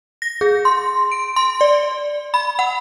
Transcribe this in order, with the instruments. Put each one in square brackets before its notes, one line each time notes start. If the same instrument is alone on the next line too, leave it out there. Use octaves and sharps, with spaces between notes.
[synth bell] A#6
G#4
C6
D7
C6
D5
B5
F#5